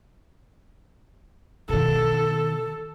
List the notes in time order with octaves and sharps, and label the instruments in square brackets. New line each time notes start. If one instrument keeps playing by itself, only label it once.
[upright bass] B2 D#3 [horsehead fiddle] A4